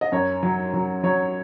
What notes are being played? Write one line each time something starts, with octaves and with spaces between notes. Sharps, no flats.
D#5
F#2 C#5
F#3
F#3
F#3 C#5